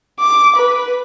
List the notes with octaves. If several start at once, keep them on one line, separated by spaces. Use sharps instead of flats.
D6
B4